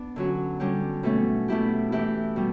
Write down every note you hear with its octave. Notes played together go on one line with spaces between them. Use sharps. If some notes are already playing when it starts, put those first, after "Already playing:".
Already playing: B3 D4
D3 F#3 C#4 F#4
D3 G3 C#4 G4
B2 F#3 A3 C#4
B2 A3 E4 G4
E3 A3 E4 G4
B2 G3